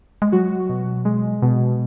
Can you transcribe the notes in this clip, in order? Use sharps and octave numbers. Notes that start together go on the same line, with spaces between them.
G#3
F#3 F#4
B2
G#3
B2